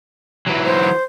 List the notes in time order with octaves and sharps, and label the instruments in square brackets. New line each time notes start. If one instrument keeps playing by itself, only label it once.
[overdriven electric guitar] E3 F#3
[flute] C5